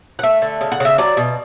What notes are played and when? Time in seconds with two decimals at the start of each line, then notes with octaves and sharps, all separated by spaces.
0.19 F#5
0.23 A3 E5
0.42 D3
0.61 C#3
0.72 F#5
0.80 C#3 E5
0.98 F#3 D5
1.17 B2